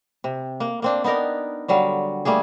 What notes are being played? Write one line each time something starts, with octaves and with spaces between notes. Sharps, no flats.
C3
A#3
A#3 C4 D4
B3 D4 D#4 A#4
D3 F#3 G3 F5
G3 A3 A#3 G#4